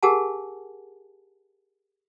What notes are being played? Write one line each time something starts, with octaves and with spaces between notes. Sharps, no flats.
G4 G#4 A#4 F#5 G#5 A5